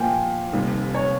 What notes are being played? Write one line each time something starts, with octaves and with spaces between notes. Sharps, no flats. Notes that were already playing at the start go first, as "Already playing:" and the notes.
Already playing: A#2 F3 A#3 G5 G#5
F1 D#2 D#3 G3 C4
C#5